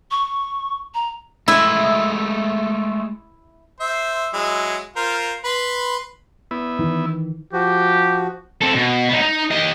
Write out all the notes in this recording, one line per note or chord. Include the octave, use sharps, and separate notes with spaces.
C#6
A#5
G#3 A3 E4
C5 E5
F#3 G#3 E4
F4 A#4 C5
B4 B5 C6
B3 E4
D#3 E3
F3 F#4 G4
C4 A4
B2
B3 D#4
D#4
G4 D#5